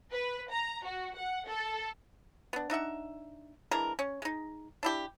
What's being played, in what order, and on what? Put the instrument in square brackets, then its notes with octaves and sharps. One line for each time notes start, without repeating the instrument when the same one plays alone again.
[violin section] B4
A#5
F#4
F#5
A4
[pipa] B3 D4
D4 D#4 E5 F#5
E3 G#3 D4 A#4
C#4
G#3 D#4
D4 E4 G4